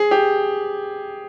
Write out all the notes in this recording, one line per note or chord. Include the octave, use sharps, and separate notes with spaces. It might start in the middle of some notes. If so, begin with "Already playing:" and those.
Already playing: G#4
G4